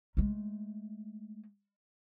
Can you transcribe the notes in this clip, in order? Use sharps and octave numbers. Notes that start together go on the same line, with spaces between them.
G#3 A3